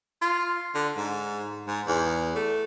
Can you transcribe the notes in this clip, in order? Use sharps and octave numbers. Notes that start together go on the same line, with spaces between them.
F4
D3
G#2
G#2
E2
A3